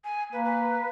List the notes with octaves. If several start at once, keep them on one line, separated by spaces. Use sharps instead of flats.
G#5
A#3 B4
B4